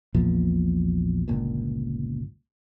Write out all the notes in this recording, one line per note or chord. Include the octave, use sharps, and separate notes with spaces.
A#1 E2 A#2 F3
G1 C#2 A#2